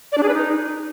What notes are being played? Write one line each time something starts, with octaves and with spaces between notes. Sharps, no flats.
D5
D4
G#4
B4
D#4